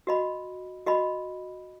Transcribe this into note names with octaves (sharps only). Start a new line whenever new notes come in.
F#4 D#5 B5
F#4 D#5 B5